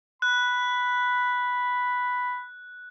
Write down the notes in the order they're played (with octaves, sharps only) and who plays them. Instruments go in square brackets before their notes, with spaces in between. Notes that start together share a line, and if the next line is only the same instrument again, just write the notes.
[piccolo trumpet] B5 [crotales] F#6